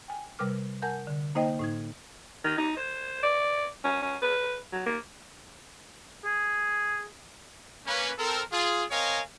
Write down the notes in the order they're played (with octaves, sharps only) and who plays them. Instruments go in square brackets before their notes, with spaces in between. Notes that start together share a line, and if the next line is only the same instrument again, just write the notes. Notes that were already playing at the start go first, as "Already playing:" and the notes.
[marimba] G5 G#5
C3 G3 A#4 B4 D6 F6
A#4 F#5 G#5 A5 G6
D3
A#3 D#4 C5 D#5 G5
A2 D#4 G#6
[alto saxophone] D#3
D#4
C5
D5
C#4
C#4
B4
F#3
A#3
[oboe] G#4
[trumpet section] A#3 C#4 B4
C4 A4 A#4
F4 G#4
C4 A#4 C#5 D#5 F5 G#5